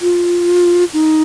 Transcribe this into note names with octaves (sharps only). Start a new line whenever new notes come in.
F4
D#4